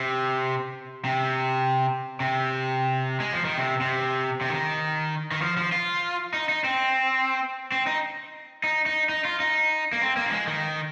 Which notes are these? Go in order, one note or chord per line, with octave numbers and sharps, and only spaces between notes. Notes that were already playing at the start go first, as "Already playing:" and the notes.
Already playing: C3
C3
C3
G#3
F3
D#3
C3
C3
C3
D#3
D#3
F3
F3
F4
D#4
D#4
C4
C4
D#4
D#4
D#4
D#4
F4
D#4
A#3
C4
A#3
F3
G#3
D#3